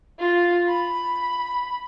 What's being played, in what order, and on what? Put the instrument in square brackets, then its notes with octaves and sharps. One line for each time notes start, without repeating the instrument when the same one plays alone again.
[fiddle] F4
B5